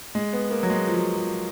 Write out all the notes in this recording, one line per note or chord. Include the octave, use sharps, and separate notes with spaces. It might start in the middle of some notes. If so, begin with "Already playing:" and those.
G#3
B3
A#3
F#3
G#3
F3
F#3
F3